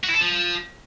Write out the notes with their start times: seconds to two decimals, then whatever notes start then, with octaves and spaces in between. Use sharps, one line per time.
0.04 F#4
0.09 E4
0.15 A4
0.21 F3